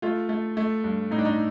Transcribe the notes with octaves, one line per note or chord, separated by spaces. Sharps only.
A3 F4
A3
A3
G2
A2 D#4
D4
D#4